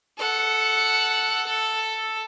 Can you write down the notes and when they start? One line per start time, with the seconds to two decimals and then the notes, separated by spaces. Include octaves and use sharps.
0.18 A4 F#5
1.46 A4